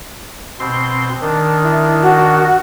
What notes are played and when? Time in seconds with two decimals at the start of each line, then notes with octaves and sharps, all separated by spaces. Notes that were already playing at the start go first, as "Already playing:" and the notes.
0.59 B2 C4 C6
1.21 D#3 D4
1.63 E4
2.03 F#4